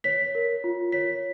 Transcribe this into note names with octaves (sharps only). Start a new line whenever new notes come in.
C#5 B6
A#4
F4
C#5 B6